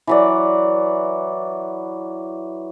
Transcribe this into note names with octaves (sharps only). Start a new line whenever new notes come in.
E3 F#3 D5